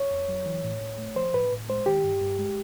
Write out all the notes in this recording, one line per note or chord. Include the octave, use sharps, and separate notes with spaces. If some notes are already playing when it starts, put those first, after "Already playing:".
Already playing: C#5
F2
F#3
E3
A2
A2
A3
F3 C5
A2 B4
A2
G#3 C5
D#3 G4
G2
G2
G#3